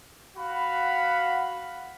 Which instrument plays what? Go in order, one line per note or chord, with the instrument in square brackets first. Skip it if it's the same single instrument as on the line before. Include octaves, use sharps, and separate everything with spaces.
[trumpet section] F#4 F5 F#5 B5